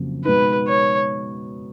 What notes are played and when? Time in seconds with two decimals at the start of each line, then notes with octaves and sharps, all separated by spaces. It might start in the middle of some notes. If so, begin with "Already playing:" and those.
Already playing: F2 C#3 F#3 A#3
0.25 B2 G#3 B3 D#4 B4
0.68 C#5